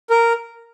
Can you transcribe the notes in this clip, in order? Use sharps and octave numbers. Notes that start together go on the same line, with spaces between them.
A#4